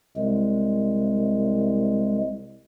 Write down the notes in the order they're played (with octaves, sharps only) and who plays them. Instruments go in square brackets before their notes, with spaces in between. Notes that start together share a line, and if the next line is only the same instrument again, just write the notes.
[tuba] C2 [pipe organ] G#3